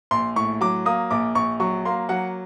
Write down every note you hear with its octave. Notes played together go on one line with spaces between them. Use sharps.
A#1 C6
A2 C#6
F#3 D6
A#3 D#6
A#1 D6
A#1 C#6
F#3 C#6
A#3 C6
F#3 F#5